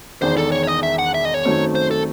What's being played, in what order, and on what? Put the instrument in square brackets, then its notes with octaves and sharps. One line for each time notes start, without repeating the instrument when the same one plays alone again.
[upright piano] E1 E2 D#3 [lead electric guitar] C5
[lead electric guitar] A4
C#5
C#5
D#5
E5
F#5
E5
D#5
C#5
[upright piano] F#2 D#3 F#3 A3 C4
[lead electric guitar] C5
A4